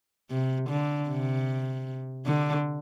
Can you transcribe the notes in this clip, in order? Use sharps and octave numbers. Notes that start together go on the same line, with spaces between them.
C3
D3
C3
D3